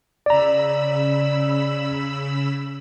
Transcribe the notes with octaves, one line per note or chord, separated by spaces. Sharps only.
C#3 D5 A#5 B5 E6